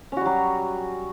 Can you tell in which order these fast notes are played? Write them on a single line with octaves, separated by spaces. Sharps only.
C#4 F#4 G3 F#3